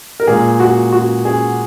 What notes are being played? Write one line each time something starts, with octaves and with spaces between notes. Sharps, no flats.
A#4
A#2 G#3 G#4
F#4
F#4
G#4